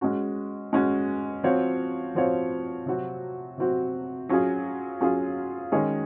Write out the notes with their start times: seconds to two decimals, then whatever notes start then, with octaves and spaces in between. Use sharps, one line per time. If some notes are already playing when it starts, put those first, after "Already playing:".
0.01 G#3 C#4 F#4
0.73 G#3 C#4 F#4
1.44 F3 C4 F#4 C#5 F5
2.15 F3 C4 F#4 C#5 F5
2.86 C3 F#3 C4 F#4
3.58 C3 F#3 C4 F#4
4.29 F#3 C#4 F4 G#4
5.01 F#3 C#4 F4 G#4
5.72 D#3 G#3 C#4 G#4 C#5